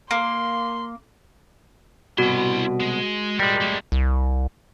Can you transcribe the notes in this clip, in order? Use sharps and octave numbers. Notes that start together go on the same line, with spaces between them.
A#3 C6
C2 B2 E4 F#4 C6
G#3
G3 G#3 A#4 D5
A3 A#3
C2